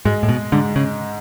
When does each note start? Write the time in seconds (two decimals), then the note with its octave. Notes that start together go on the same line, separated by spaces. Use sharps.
0.05 G#2 G#3
0.23 A2
0.29 B2
0.52 G#2 D3
0.76 C#3